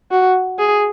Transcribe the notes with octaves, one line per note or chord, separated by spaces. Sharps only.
F#4
G#4